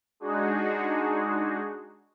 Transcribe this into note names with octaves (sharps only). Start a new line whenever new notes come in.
G#3 D4 D#4 F#4 G#4